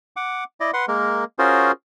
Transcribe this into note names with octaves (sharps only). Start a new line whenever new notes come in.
F#5 D6
E4 D5 D#5
B4 F#5 C6
G#3 A#3 A#4
C#4 F4 F#4 G#4 A#4 C5